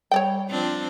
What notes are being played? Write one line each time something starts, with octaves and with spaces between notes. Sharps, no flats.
G3 C#5 D5 G5
F3 C4 D4